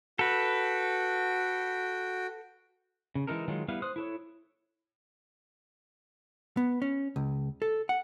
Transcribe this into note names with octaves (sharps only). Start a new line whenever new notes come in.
F#4 A4 B4 G5
C#3
E3 G#3 D#4 A4 A#4
D#3 F#3 G#3 F4
G3 B3 E4 B4 F5
C5 D#6 F#6
E4 A4 C#5
B3
C#4
C#2
A4
F#5